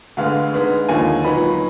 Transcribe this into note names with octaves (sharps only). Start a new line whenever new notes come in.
D2 D3 G#3 B3 F5
D3 G#3 B3 D#4
D#2 D3 F3 A#3 D#4 G#5
A#2 F#3 B3 D#4 B5